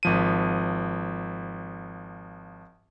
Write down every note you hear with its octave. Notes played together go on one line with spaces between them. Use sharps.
G#1 F3 D#7